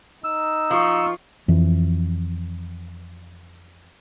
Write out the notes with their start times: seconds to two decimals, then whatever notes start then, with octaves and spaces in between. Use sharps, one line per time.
0.24 D#4 E6
0.71 F3 F4 C#6
1.48 F2 E3